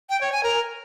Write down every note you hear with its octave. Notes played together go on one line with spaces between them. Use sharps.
G5
C#5
G#5
A#4